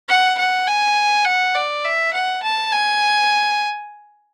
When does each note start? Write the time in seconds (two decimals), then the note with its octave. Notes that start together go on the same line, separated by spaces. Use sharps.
0.09 F#5
0.38 F#5
0.67 G#5
1.25 F#5
1.55 D5
1.85 E5
2.14 F#5
2.43 A5
2.72 G#5